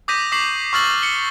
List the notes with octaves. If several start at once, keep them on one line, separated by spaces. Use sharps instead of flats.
D6 D#6 G6 A#6 B6 D#7
C#6 D6 B6 C7 E7 F#7
C#6 E6 F6 A6 A#6 F#7
C#7 G7